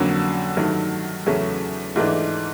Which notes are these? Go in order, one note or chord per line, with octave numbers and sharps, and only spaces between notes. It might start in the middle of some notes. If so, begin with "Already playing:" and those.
Already playing: F2 D3 F#3 A#3 C#4
G2 D#3 F#3 A3
E2 C#3 F#3 A3 C#4
G#2 E3 A3 D4